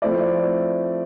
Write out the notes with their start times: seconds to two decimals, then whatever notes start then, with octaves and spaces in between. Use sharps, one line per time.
0.02 F3 A3 C4 E4 D5